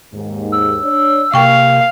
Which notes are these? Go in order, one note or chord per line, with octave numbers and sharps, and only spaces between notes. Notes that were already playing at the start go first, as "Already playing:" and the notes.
D#2 G#2
E6
D4 C#5 D5
C3 A#3 F5 G5 C#6